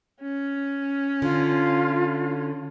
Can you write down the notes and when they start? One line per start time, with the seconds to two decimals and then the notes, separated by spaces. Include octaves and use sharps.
0.22 C#4
1.22 D3 F4